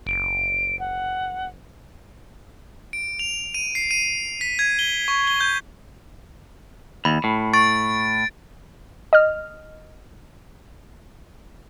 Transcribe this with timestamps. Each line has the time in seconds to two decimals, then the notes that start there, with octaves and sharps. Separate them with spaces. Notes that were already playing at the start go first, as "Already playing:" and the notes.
0.06 F#1 D7
0.79 F#5
2.93 D7
3.19 F7
3.54 D#7
3.75 C7
3.91 D#7
4.41 B6
4.59 G#6
4.79 G7
5.08 C#6
5.27 G7
5.40 G6
7.05 D#2 B5
7.24 A2
7.53 C#6 A6 D7
9.13 D#5 F6